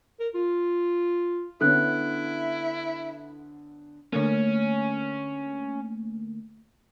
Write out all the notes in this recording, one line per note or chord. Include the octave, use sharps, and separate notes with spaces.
A#4
F4
D3 B3 C#4 E4 A4 F#6
D3 A3 A#3 C#4 C#5